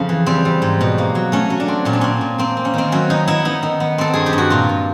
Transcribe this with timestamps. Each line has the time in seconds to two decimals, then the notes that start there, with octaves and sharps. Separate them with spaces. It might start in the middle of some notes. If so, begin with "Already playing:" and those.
Already playing: F2 C#3 C4
0.09 E3
0.26 G3 C4
0.45 G3
0.62 G#2
0.81 B2
0.98 A#3
1.15 F#3
1.32 A3 C#4
1.50 F#3
1.60 D4
1.68 C4
1.85 A#2 C#4
1.93 D4
2.01 C4 C#4
2.21 A#2
2.38 A#3 C4
2.57 A#3
2.65 C#4
2.74 D#3 C4
2.92 F#3 C#4
3.10 B3 D#4
3.28 B3 E4
3.45 B3 D#4
3.63 D#3
3.80 B3
3.98 C4 A4
4.13 G2 G#4
4.26 G4
4.33 G2
4.38 F#4
4.50 A#2 F4
4.69 A#2